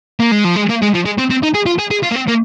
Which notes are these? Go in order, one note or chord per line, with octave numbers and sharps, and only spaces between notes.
A#3
G#3
F3
G#3
A#3
G#3
F3
G#3
C4
C4
D#4
G#4
F4
G#4
G#4
F4
A#3
C4
A#3